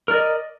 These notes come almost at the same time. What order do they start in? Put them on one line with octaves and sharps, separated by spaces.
A#4 D5 D#5